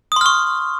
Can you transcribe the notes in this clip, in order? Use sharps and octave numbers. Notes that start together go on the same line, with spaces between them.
C6 C#6 D#6 F6